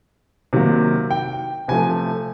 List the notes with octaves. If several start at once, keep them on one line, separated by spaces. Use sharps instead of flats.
C3 D#3 F#3 A#3
G5
C3 F3 A3 G#5